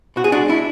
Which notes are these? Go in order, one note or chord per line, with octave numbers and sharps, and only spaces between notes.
B2 F#4
G#4
G#3 D4 F#4
D4 E4